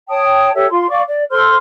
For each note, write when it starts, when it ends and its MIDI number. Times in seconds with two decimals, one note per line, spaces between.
0.09 0.51 73
0.09 0.51 79
0.09 0.51 81
0.09 0.51 87
0.54 0.66 67
0.54 0.66 69
0.54 0.66 73
0.54 0.66 76
0.70 0.88 65
0.70 0.88 84
0.89 1.01 74
0.89 1.01 77
0.89 1.01 85
0.89 1.01 86
1.06 1.23 74
1.31 1.55 69
1.31 1.55 72
1.31 1.55 84
1.31 1.55 89